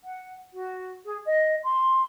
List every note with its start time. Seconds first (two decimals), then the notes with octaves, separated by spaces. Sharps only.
0.04 F#5
0.53 F#4
1.05 G#4
1.26 D#5
1.64 C6